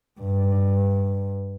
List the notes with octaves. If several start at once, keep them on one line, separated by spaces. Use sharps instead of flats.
G2